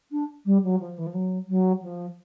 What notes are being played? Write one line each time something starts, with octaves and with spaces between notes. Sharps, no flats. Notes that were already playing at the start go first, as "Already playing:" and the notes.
D4
G3
F#3
F3
E3
F3
F#3
F#3
F3